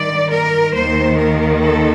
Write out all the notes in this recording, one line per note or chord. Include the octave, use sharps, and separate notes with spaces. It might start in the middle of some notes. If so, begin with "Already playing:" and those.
Already playing: G2 D#3 D5
A#4
D#2 D#3 C5
A#4
A4